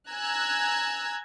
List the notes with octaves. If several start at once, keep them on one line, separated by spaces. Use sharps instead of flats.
G#5 A#5 E6 F#6 G#6